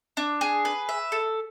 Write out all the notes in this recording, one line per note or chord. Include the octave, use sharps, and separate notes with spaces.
D4
G#4
B4
E5
A4